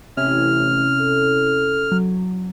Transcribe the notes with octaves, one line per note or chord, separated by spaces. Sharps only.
A1 C3 C#4 E4 F6
A4
F#3